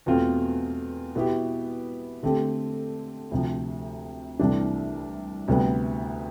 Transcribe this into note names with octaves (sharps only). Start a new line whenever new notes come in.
E2 B2 A3 C4 F4
B2 B3 E4 G4
D3 A3 C4 G4
D2 C3 F3
C2 C3 E3 A3 D4
D2 C3 G3 B3